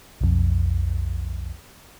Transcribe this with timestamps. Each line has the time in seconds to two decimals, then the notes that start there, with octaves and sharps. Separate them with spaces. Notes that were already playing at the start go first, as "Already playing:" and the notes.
0.21 B1 F2